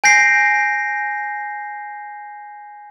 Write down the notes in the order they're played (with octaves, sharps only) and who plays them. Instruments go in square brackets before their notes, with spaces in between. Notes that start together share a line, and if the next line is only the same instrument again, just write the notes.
[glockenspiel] G#5 G6 A#6 C7